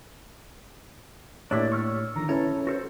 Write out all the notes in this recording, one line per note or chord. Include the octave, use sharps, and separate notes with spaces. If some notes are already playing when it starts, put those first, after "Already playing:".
A2 A#3 D4 E4 G4 C#5 D5
C#6 E6 F6
D3 D#3 F3 A#5
C#4 E4 A4 B4 C#5
F#4 A4 C5